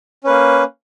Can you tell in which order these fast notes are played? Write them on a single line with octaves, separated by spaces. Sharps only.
C#4 B4 A#3